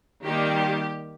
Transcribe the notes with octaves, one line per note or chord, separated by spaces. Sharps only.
D#3 G3 A#3 G4